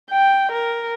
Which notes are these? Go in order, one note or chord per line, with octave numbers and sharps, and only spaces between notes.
G5
A#4